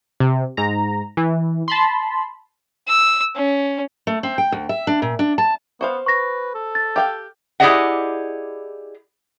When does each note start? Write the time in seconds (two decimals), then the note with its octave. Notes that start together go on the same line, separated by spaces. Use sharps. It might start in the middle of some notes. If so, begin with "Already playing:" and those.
0.20 C3
0.57 G#2 A#5
1.17 E3
1.68 A5 B5 C6
2.87 E6
3.35 C#4
4.07 A3
4.23 C4
4.38 G5
4.52 D2
4.69 E5
4.87 D4
5.02 A#2
5.19 D4
5.38 A5
5.81 B3 F#4 C5 F5
6.06 B4 C#6 A#6
6.54 A4
6.75 A6
6.96 G4 F5 G5
7.60 E4 G4 G#4 D5 D#5 F#5